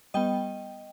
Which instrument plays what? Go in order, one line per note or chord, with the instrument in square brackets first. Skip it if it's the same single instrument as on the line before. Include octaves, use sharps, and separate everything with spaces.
[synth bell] G3 B3 D#5 G5